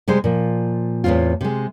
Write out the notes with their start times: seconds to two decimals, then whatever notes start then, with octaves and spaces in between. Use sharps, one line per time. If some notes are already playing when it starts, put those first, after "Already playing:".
0.08 C3 G3 G#3 C5
0.24 A#2 F3
1.04 E2 A2 C#3 C4 F4
1.41 C3 G#3